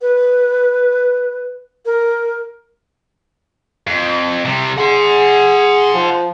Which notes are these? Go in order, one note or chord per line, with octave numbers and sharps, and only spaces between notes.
B4
A#4
F2
C3 G3
G#4 F#5 C6
F3